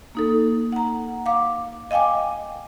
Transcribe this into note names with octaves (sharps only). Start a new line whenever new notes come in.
A#3 D#4 A4
F#5 A#5
F5 D6
D#5 F5 G5 G#5 D6